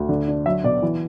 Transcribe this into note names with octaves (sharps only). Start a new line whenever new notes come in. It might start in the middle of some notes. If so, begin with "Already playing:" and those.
Already playing: D2
D3
D4
F#3 E5
B2 D5
E3